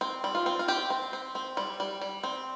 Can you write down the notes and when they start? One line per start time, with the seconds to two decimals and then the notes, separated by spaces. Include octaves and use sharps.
0.01 C4
0.24 G3
0.35 F4
0.46 C4
0.59 F4
0.68 C4 G4
0.90 C4
1.13 C4
1.35 C4
1.57 G3
1.80 G3
2.01 G3
2.23 C4